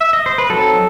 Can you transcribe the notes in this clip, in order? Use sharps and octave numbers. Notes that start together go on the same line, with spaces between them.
E5
D#5
C5
B4
F#3 C4 D#4 A4